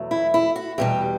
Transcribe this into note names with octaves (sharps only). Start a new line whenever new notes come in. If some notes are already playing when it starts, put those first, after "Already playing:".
Already playing: E2 B2 F#3 A3
E4
E4
F#4
E2 B2 G3 G4